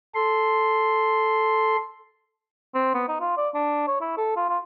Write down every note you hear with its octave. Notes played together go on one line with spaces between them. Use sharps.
A4 C6
C4
B3
D#4
F4
D5
D4
C#5
E4
A4
F4
F4